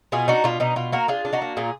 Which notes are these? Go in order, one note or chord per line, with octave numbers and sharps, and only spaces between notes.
B2 F4 G#4
D4 D#4 F#4
B2 F4
B2 D#4
B2 F4
A#3 F#4 A#4
D4 F4 G#4
D4
D#4 F#4
A#3
A#2 F4 G#4